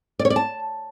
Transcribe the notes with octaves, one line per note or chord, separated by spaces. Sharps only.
D5
C#5
D5
A5